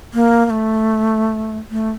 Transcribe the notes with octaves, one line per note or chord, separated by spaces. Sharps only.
A#3
A#3
A3
A3